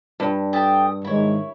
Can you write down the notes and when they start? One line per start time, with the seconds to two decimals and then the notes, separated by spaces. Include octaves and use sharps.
0.20 G2
0.53 G4 A4 G5 A5 D#6
1.05 G#2 D#3 E4 C#5